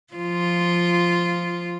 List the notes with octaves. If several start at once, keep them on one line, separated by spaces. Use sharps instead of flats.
F3 F4